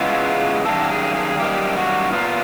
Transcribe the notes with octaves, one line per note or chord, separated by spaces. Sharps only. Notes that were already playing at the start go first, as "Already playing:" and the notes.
Already playing: C#3 E3 G#3 B3 F4
F#2 D#3 G3 A#3 A4
G#4
G#4
F#2 D#3 G3 A#3 G4
F#4
A#2 F#3 B3 F4